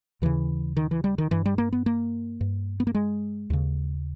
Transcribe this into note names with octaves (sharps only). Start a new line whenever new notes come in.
D#2 C#3 E3
D#3
E3
G3
D#3
G2 E3
G3
A#3
B3
A#3
G2
B3
A#3
G#3
D#2 C#3